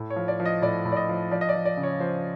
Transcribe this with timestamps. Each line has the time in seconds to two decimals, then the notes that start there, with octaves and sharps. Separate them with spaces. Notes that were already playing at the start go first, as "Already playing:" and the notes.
Already playing: A2
0.10 C#5
0.16 F3
0.28 D5
0.40 F3
0.46 D#5
0.62 A2 D5
0.85 A2
0.92 D5
0.96 D#5
1.09 F3
1.31 F3 D5
1.41 D#5
1.49 D5
1.54 F3
1.65 D5
1.77 C#3
1.83 C#5
2.00 F3 C5